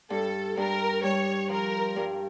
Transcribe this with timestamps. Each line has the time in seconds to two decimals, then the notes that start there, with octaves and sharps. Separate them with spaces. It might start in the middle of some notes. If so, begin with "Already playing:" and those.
0.10 G2 A4
0.57 G2 A#4
1.03 G3 C#5
1.49 F3 A#4
1.96 G2